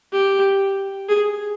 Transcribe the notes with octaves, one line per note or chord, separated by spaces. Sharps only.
G4
G#4